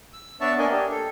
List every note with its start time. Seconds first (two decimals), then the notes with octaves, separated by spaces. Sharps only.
0.13 E6
0.41 B3 D4 C#5 D5 E5 A5
0.59 A#3 D4 A#4 D#5 G#5
0.71 D4 G4
0.91 A4